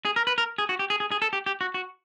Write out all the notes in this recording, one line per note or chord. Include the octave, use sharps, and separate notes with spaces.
G#4
A#4
B4
A#4
G#4
F#4
G4
G#4
G#4
G#4
A4
G4
G4
F#4
F#4